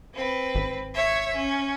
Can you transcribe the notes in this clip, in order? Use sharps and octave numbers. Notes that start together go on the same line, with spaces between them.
C4 B4
G#1
C#5 E5
C#4